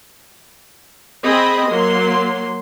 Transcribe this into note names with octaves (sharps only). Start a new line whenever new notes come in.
C4 G#4 D#5 B5
F#3 A#3 C6